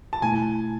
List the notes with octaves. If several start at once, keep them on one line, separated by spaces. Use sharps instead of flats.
A5
B2 A3 E4 G#5